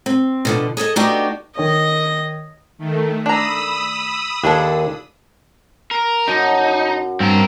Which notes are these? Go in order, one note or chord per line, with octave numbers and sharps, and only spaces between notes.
C4
B2 D3 F3
G#4 A4 C#5 D#5
A3 B3 D4 D#4 F#4 G4
D#3 C#5 D#5
D#3 A3
D4 A#5 B5 D#6 E6
D#2 D4 G#4 A4
A#4
F#2 D#4 A5
G2 C4 A#4